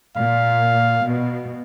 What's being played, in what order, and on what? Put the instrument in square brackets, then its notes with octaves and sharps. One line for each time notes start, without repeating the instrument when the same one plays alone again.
[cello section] A#2 [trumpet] F5
[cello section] B2